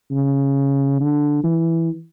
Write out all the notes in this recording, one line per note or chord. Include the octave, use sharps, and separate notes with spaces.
C#3
D3
E3